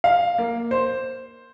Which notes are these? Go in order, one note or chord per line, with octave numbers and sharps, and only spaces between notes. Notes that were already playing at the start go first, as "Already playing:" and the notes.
F5
A#3
C5